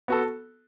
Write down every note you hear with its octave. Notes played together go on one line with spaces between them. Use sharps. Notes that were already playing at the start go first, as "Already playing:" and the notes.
B3 F#4 A4